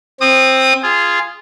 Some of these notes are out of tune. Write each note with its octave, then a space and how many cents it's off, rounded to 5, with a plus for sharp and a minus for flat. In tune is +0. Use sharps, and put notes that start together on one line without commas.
C4 +10 D#6 -25
F4 -10 G#4 +0